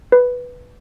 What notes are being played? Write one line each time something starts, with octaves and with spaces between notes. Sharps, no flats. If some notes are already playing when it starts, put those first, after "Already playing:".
B4